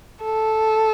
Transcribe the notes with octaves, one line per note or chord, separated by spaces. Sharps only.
A4